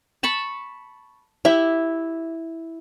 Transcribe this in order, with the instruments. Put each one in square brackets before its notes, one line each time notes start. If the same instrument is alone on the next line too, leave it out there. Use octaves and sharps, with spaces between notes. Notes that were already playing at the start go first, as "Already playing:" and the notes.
[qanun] A5 B5 C#6
[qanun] E4 [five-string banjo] G4 E5